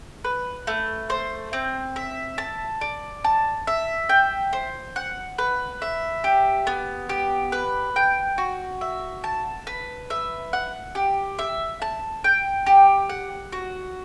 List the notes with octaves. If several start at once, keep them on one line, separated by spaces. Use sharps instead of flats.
B4
A3
C5
C4
E5
A5
D5
A5
E5
G5
C5
F#5
B4
E5
G4
B3
G4
B4
G5
F#4
E5
A5
B4
E5
F#5
G4
E5
A5
G5
G4
F#5
F#4